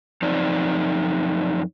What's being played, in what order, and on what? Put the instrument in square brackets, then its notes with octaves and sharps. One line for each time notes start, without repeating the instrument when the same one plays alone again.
[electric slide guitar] F#2 F3 C4 D#4 D5